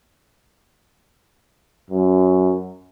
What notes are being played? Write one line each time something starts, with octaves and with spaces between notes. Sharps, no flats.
F#2